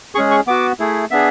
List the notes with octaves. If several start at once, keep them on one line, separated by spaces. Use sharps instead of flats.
G#3 C#4 G#4 C#6
C#6
B3 F#4 D6
A3 E4 G#4
B3 D4 G#4 E5